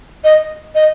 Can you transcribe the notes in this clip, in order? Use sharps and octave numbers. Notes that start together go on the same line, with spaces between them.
D#5
D#5